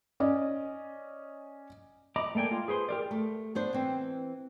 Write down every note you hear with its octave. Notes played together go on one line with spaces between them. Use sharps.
C#4 D5 D#5
D#5 A#5 B5 D6
A3 A#3 D5 G5 G#5
F4
G#4 B4 C5 C6
G4 A#4 D5
A3
B3 D4 C5
E3 C4